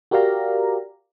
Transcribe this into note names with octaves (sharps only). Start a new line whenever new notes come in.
F#4 G4 A#4 D5 F5 A#5